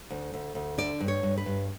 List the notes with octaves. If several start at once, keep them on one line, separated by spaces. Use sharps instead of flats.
D2
D2
D2
D3 D5
G2
C#5
G2
B4
G2